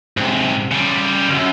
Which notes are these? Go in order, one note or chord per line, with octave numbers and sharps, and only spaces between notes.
G#2 C3
C#3 G3
C#2 F#2